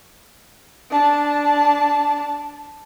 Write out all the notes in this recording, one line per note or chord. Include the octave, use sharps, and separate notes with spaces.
D4 A5